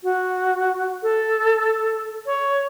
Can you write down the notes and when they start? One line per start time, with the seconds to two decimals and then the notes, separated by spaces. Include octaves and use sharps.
0.03 F#4
1.03 A4
2.26 C#5